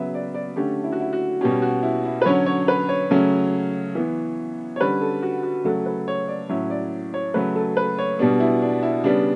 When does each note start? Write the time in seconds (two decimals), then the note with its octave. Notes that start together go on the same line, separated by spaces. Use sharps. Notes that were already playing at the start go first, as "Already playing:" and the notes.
Already playing: C#3 F#3 B3 B4 E5
0.14 D5
0.34 D5
0.56 D3 A3 C#4 G4
0.84 E4
0.92 F#4
1.00 E4
1.13 F#4
1.41 B2 G3 C#4 G4
1.62 F#4
1.83 E4
2.05 E4
2.22 B4
2.26 D3 F#3 C#4 C#5
2.46 C#5
2.68 B4
2.89 C#5
3.11 C#3 F#3 A3 C#4
3.95 E3 B3
4.76 C#5
4.80 D3 G3 C#4 B4
5.01 A4
5.23 F#4
5.43 F#4
5.65 C#3 F#3 A3 A4
5.86 B4
6.08 C#5
6.28 D5
6.49 A2 F#3 C#4 E5
6.70 D5
7.14 C#5
7.34 C#3 F#3 A3 B4
7.56 A4
7.77 B4
7.99 C#5
8.19 B2 G3 B3 D4
8.40 E4
8.62 D4
8.83 E4
9.04 C#3 G3 B3 D4